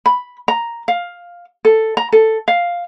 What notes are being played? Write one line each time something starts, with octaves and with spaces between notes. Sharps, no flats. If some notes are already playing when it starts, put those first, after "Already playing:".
B5
A#5
F5
A4
A#5
A4
F5